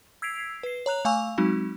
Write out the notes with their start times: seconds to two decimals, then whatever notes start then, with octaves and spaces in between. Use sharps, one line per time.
0.22 E6 G#6 B6 C7 D7 F7
0.63 B4 C7
0.86 C#5 A#5 F#6 F7
1.05 A3 F5 G#5 C#6 E6 F7
1.38 F#3 G#3 C4 D#4 F#4